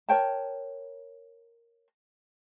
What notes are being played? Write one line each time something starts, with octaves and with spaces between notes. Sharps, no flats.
A#4 C#5 G5 A5